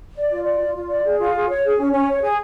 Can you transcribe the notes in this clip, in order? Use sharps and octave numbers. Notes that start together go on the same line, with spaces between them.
D5
F4
D5
F4
F4
D5
G#4
F4
G#4
C#5
G#4
C#4
C#4
C#5
G#4